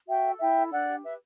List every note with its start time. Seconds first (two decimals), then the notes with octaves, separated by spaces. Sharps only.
0.08 F#4 E5 G5
0.24 A4
0.40 E4 E5 G5
0.56 A4
0.71 D4 D5 F#5
0.87 G4
1.03 B4 E5